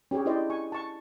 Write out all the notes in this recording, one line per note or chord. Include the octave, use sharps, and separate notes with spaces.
C#4 G4 G#4 C#5
D4 E4 G4 C5 D5 D#5
G#5 C#6
A5 C#6